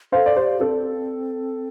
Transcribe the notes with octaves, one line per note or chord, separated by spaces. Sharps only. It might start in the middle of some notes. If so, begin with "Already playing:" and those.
A4 C5 F5
D5
G4 C5
C4 A4